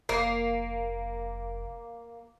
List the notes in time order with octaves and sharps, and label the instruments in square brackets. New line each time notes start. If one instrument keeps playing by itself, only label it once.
[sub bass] F1 [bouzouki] A#3